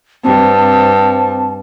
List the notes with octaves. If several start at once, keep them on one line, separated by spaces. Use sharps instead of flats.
G2 C4 A5